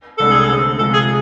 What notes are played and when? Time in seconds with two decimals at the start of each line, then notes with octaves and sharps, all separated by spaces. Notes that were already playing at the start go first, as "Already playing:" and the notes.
0.18 C2 C3 G#3 D4 A4
0.32 G#4
0.44 A4
0.49 D3 A3 C4
0.79 C3 F3 G#3 A4
0.93 G#4